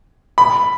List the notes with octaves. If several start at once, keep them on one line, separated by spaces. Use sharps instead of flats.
B5